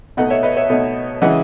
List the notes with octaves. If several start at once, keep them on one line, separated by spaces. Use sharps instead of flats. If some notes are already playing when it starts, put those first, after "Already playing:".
B2 A3 D#4 D#5 F#5
C#5 E5
B4 D#5
C#5 E5
B2 A3 D#4
C#3 E3 G#3 D#5 F#5